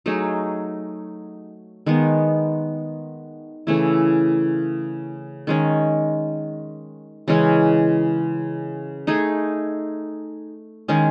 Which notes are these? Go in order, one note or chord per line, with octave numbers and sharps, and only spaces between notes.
F#3 A3 D#4 G#4
D#3 G#3 B3
C#3 E3 A3 E4
D#3 G#3 C#4
C#3 E3 G#3 C#4
A3 D#4 G#4
D#3 G#3 C#4 G#4